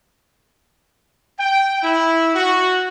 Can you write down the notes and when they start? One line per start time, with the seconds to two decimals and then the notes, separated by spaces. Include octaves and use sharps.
1.40 G5
1.82 E4
2.35 F#4